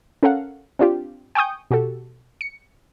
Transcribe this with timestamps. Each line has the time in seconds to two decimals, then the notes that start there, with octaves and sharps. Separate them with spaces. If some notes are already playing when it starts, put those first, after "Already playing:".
0.23 C#4 A4 A#4 F5 F#5
0.79 C4 D4 F4 G4
1.35 G5 G#5 C#6 D#6 G6
1.70 B2 F#4 G4 A4
2.41 C#7